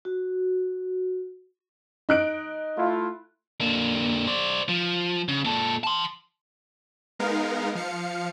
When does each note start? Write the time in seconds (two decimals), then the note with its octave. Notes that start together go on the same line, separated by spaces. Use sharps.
0.05 F#4
2.09 D#4 F#6 D7
2.78 A3 E4 F4
3.60 D3 A#3
4.27 C5 D5
4.69 F3
5.28 C#3
5.45 A#2 A4
5.84 A5 C6
7.19 G#3 B3 D#4 A#4 F5
7.75 F3 F5 C#7